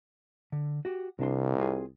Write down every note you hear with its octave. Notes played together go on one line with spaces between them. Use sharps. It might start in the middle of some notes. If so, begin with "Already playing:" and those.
D3
F#4 G4
C2 C3 D4 C6
C4 F4 G#4